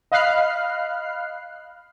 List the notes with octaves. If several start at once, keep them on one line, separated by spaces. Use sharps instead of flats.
D#5 F5 B5 F6 F#6 C7